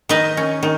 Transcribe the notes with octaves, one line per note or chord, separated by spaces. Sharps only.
D#3 B4 D#5
C#4
D#3